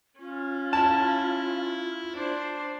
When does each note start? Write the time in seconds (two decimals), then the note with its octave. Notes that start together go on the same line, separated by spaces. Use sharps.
0.20 C#4 F4
0.73 E4 A5
2.14 D4 C5